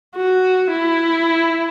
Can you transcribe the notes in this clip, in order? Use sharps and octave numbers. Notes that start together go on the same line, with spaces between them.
F#4
E4